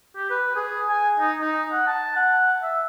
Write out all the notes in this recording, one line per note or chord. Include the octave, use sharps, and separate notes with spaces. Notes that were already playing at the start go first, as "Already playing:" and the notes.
G4
B4
G#4
G#5
D#4
D#4
F#5
A5
F#5
E5